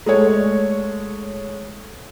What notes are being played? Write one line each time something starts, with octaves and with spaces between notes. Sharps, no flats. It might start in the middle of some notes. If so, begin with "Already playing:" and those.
G#3 A3 C#5